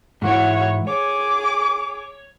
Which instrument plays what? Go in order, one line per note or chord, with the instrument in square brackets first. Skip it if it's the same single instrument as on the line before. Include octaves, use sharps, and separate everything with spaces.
[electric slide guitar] G#2 E3 E4 [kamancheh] F#4 C#5
[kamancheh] G#4 D6 [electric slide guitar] C#5